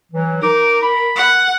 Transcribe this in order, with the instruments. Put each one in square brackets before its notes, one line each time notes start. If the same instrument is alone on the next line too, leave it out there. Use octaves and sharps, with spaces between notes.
[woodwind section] E3 F#3
[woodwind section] D#4 D6 [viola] A#4
[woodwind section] B5
[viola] F#5